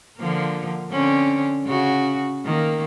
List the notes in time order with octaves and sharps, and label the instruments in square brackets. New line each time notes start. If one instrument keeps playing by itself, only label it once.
[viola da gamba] D3 F3 A#3
D3 C4 C#4
C#3 F#4
D#3 A#3